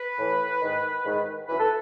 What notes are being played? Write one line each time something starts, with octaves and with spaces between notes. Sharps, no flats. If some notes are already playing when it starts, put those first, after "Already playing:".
Already playing: B4
A2 E3
G#2 D#3
G#2 D#3
F#2 E3 B4
A4